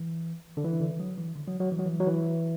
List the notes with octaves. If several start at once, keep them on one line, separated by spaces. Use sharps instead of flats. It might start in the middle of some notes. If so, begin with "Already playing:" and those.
Already playing: E3
D3
E3
D3
E3
F#3
E3
D3
F#3
F#3
E3
F#3
E3
F#3
E3